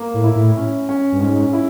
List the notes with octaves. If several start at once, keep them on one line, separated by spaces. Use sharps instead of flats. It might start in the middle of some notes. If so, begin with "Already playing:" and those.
Already playing: A#3
A2
E4
A2
C#4
C#4
G2
G#2 C#4
E4